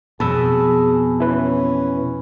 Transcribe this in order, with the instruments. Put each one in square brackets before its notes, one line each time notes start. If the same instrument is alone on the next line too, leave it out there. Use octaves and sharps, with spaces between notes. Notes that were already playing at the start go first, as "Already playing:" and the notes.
[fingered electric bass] F2 [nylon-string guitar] B2 [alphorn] G#4 [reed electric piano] A5 B5 E6
[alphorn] C#4 [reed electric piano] E4 B4 B5